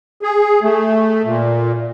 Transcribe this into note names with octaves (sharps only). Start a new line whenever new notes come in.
G#4
A3
A#2